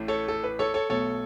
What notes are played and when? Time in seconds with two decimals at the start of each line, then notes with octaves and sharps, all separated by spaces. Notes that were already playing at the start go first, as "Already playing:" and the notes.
Already playing: A1 A2 A3
0.08 A4 C#5
0.28 A4
0.44 B4
0.59 A4 C#5
0.74 A4 C#5
0.90 B1 B2 A3 A4 C#5